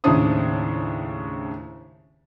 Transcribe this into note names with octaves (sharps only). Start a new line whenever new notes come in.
D#2 A2 C#3 D4 C5 D#6